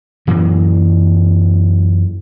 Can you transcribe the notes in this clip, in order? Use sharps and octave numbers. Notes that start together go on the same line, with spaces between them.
F#2 E3 F#3 A#3